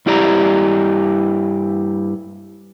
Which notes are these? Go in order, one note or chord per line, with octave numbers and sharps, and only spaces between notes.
G2 E4 G4 D5 A#5